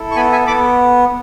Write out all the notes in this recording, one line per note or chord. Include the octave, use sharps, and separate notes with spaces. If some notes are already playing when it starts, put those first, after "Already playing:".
Already playing: E4 A4
C#6
B3 G#5 B5
E5 G#5
B3 B5 D6